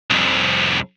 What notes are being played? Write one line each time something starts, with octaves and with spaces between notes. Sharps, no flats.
C2 F2